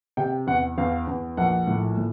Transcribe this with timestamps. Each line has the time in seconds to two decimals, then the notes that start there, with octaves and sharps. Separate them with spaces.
0.17 C3 G5
0.47 E2 F#5
0.78 E2 F5
1.07 E2
1.37 A#1 F#5
1.67 A2
1.97 A2